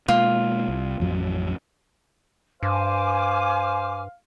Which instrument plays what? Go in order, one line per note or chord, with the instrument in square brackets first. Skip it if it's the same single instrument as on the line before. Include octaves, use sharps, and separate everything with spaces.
[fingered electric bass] B2 G#3 A#3 [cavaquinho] F4
[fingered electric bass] C2
A1 F2 F#3
[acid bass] G2 [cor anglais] C5 [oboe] F5 [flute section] G#5 D6